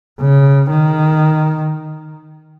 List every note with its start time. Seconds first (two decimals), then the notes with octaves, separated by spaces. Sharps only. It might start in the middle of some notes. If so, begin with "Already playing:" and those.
0.21 C#3
0.71 D#3